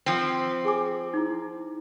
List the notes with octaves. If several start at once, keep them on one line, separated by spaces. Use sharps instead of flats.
F3 C4
G#4 G#5 D6
D#4 E4